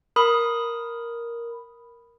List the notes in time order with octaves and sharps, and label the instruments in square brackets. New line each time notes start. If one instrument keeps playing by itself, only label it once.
[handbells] A#4 B5 D#6